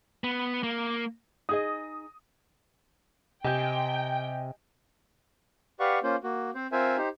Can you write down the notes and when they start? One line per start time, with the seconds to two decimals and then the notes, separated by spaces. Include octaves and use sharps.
0.24 B3
0.63 A#3
1.49 D#4 G#4 D#5 D#6
3.44 C3 G4 D#5 G5 G#5 G6
5.80 G4 B4 D5 F5 F#5 C#6
6.03 A#3 C#4 F4 C5
6.24 A#3 F#4
6.55 C4 C5
6.72 C4 F4 A#4 C5 E5 G#5
6.97 D#4 G4 C5